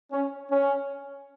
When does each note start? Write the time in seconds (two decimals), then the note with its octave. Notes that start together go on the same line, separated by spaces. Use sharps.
0.12 C#4
0.51 C#4